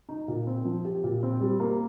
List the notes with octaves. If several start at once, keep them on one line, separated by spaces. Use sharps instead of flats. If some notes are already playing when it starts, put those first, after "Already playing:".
D#4
A#2
C4
F3
G4
A#2
C4
G3
A#3